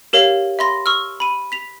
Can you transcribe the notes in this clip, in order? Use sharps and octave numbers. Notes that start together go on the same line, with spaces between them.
G4 A#4 C#5 F5 F7
E5 B5 C6 A#6
C#6 E6 F6
B5 D#7
B6 F7